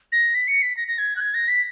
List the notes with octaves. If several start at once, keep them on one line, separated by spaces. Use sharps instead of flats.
A#6
B6
C#7
B6
A#6
A#6
G#6
F#6
G#6
A#6
B6